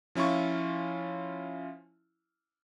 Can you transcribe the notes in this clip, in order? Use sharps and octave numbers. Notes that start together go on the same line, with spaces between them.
F3 C#4 E4 F4 C#6